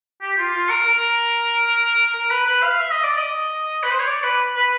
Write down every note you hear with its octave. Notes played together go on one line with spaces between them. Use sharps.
G4
F4
F4
A#4
A#4
A#4
B4
B4
F5
E5
D#5
D5
D#5
B4
C5
C#5
D5
B4
B4